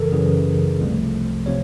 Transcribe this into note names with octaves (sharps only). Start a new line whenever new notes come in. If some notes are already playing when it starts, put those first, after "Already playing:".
Already playing: F#2 C#3 E3 A4 A#4
F#2 C#3 E3 G#4
C2 C3 F3 A3
C3 F3 C#5